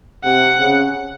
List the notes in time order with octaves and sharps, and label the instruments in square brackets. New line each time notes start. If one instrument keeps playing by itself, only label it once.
[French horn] C3 [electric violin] F#5
[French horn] C#3